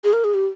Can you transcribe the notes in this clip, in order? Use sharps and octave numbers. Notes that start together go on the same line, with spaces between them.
G#4
A#4
G#4
G4